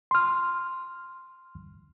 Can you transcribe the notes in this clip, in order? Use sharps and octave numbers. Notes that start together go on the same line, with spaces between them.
C6 F6